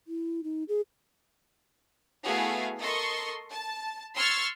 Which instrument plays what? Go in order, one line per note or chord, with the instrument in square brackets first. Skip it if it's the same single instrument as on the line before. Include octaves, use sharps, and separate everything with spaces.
[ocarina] E4
D#4
G#4
[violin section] A3 B3 E4 F#4 G#4 F5
A4 A#4 D#5 C6 C#6
A5
C6 C#6 E6 F6 G#6 A6